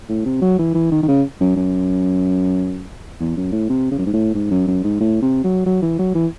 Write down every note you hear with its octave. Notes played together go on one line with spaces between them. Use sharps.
A2
C3
F#3
E3
E3
D#3
D#3
C#3
F#2
F#2
E2
F#2
A2
C3
C#3
F#2
G#2
A2
G#2
F#2
F#2
G#2
A2
C3
F#3
F#3
E3
F#3
E3